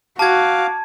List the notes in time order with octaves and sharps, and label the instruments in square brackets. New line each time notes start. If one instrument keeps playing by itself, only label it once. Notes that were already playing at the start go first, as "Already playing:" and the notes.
[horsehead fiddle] F#4 [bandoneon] F5 D6 [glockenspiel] A5 G#6